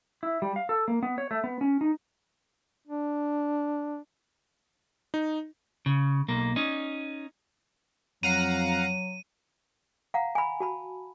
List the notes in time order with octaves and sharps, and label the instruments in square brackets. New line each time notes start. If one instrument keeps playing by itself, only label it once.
[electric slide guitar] E4
G3
F5
A4
A#3
B3
C#5
A3
B3
C#4
D#4
[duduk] D4
[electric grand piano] D#4
[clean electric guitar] C#3
B1 A#3
C#4 D#4
[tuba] F2 [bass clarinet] F#3 [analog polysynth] F5 F#5 A#5 [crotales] D#7
[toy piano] F5 F#5 A#5
G#5 B5
F#4 A5 B5